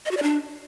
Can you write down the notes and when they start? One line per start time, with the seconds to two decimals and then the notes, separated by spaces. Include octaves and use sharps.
0.05 D#5
0.11 F#4
0.17 D5
0.23 D4